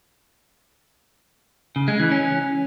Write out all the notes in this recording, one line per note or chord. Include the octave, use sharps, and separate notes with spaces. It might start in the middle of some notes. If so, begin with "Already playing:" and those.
C#3
G#3
E3
C#4